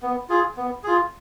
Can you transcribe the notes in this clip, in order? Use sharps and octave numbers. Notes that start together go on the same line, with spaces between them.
B3
F4 G#4
B3
F4 G#4